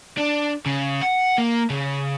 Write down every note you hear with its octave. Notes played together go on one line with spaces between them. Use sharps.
D4
C#3
F#5
A#3
C#3